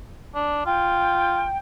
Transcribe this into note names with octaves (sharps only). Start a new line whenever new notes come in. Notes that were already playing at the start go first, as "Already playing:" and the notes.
D4
F4 G5